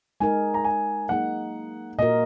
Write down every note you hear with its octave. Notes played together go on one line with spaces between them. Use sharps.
G#3 D#4 A#4 G#5
A#5
G#5
F#3 A#3 D#4 G#4 F#5
A#2 A#3 F#4 A#4 D#5